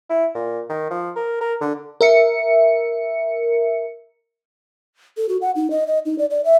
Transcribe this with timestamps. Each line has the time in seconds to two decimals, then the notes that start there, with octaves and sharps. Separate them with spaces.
0.10 E4
0.35 A#2
0.69 D#3
0.90 F3
1.16 A#4
1.41 A#4
1.61 D3
2.01 A#4 E5 C#7
5.17 A4
5.29 F#4
5.42 F#5
5.56 D#4
5.71 D#5
5.87 D#5
6.06 D#4
6.19 D5
6.31 D5
6.45 E5